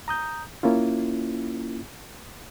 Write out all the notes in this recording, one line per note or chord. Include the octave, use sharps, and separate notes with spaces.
A#5 D#6 G6
A#3 C#4 E4 F4